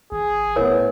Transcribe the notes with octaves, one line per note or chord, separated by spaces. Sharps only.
G#1 G#4
D#1 A2 B3 A#4 C#5